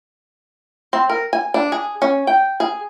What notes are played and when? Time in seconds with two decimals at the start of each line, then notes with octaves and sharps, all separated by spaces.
0.93 C4
1.10 A#4
1.33 G#5
1.54 D4
1.72 G#4
2.02 C#4
2.27 G5
2.60 G#4